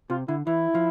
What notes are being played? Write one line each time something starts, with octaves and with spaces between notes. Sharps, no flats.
C3 F4
D3 E4
E3 E4
F3